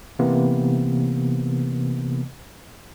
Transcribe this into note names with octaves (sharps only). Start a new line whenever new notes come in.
C3 E3 A#3 B3